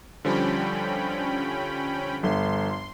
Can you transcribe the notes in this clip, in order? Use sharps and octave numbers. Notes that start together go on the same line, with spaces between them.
D3 F3 G3 C#4 G5 B5
G1 C6